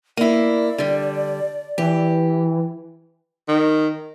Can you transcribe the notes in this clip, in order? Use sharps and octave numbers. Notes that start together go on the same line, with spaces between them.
A#3 E4 D5
D3 G3
E3 G4
D#3